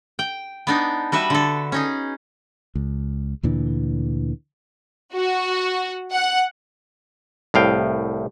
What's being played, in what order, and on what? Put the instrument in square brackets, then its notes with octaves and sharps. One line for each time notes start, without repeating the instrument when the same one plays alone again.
[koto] G5
B3 D4 D#4
G3 F#4 B4 E5
D3 A4
C#4 D#4 G#4
[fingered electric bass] C#2
D2 A#2 D3 E3
[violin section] F#4
F#5
[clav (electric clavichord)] C2 A2 F5 G5